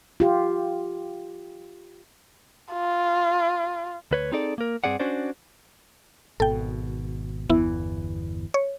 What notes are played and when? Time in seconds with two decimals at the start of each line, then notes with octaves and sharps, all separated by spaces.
0.20 F4 G4
2.73 F4
4.11 D2 B4 C#5
4.32 C4 D#4 G#4 A4 D5
4.58 A#3 A#4
4.84 G2 B2 C4 G#4 D5 F#5
4.99 C#4 D4 F#4 C5 D5
6.40 G#1 B2 A4 G5
7.50 G1 E2 E3 B3 E4
8.54 C#5